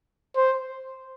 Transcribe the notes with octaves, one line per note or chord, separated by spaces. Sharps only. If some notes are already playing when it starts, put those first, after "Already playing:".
C5